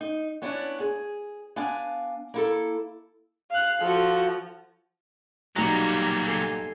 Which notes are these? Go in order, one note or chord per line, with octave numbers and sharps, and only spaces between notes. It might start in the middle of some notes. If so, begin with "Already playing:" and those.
D#4
B3 C#4 D4 E4
G#4
B3 D4 F5 G#5
A#3 E4 A4
F5 F#6
F3 F#4 A4
B1 A#2 F#3 G3 A#3 A#5 A#6
A4 G#5 C6